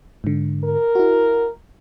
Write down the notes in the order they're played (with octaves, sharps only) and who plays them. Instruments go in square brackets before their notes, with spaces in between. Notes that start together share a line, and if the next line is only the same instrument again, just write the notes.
[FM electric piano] G#2 D3
[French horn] A#4
[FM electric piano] E4 F#4